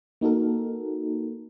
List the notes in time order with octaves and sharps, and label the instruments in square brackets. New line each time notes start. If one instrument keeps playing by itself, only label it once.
[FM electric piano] A#3 D#4 F#4 A4 A#4